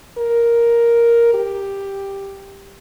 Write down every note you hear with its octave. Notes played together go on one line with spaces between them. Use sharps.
A#4
G4